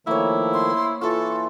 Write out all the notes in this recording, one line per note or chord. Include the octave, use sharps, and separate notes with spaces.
D#3 F3 A3 A#3 E4 C#5
C6
E3 F4 A4 C#6